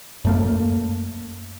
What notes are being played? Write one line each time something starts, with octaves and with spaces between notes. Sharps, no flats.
F#2 A3 A#3